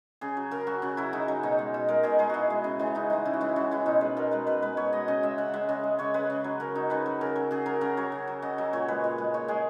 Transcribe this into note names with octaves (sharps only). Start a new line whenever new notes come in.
C#3 G#4
F#3
C#3 A#4
F#3 F#4
C#3 F#4
F#3 E4
C#3 D#4
F#3
B2 D#4
G#3
B2
G#3 A#4
B2 G#4
G#3 G#4
B2 E4 F#4
G#3
C#3
E3 G#3
C#3 D#4
E3 G#3 D#4
C#3 E4
F#4
E3 G#3 E4
C#3 F#4
E3 G#3 E4
B2 D#4
G#3 B4
B2 A#4
G#3 B4
B2 B4
G#3 B4
B2 C#5
G#3 D#5
C#3 D#5
G#3 E5
C#3 F#5
G#3 E5
C#3 D#5
G#3
C#3 C#5
G#3 B4
C#3
F#3
C#3 A#4
F#3 D#4
C#3 B4
F#3
C#3 A#4
F#3
C#3 G#4
F#3 A#4
C#3 A#4
F#3 C#5
C#3
F#3
C#3 D#5
F#3
A#2 C#5
G#3 B4
A#2
G#3
A#2 C#5
G#3 G#4